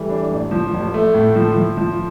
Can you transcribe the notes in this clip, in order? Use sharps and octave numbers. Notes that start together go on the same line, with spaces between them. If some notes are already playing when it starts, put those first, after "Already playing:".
Already playing: E3 G3 A3
D4
A1
F3
A1
A3
A2
F3
F3
F3